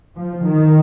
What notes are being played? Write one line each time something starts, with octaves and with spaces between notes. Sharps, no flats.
F3
D#3